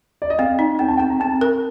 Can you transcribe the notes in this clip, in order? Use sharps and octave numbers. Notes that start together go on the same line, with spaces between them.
D5
D#5
C4 F5
D#4
C4 G5
A5
C4 G5
A#5
C4 A5
A#4